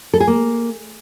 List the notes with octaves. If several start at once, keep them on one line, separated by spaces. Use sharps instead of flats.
A4
G#4
A#3